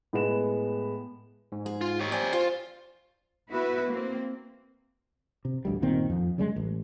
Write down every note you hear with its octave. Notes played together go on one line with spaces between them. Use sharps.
A2 G#3 B3 E7
G#2
G#2 G#4
F4
G4 C#5
C4 E4 D5 G5 G#5
F4 C5
B3 E4 F#4 B4 E5
A#3 C4
C3
A1 D2 G3
G1 A#2 D#3 C4
F2 F3
C#3 G3 G#3
A1